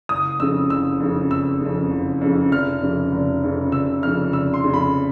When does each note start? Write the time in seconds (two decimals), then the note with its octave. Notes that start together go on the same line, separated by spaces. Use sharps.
0.09 F#1 D#6
0.39 F2 C#3 E6
0.70 F#1 E6
1.00 F2 C#3
1.31 F#1 E6
1.61 F2 C#3
1.91 F#1
2.21 F2 C#3
2.51 F1 F6
2.82 F2 C#3
3.12 F1
3.43 F2 C#3
3.72 F1 E6
4.03 F2 F6
4.08 C#3
4.33 F1 E6
4.54 C6
4.64 F2 C#3
4.74 B5